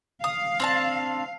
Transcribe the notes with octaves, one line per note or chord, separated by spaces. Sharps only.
F5 D#6
C4 D4 A5